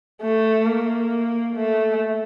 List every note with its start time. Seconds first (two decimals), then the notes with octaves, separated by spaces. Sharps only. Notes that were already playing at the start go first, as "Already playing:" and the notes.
0.22 A3
0.66 A#3
1.56 A3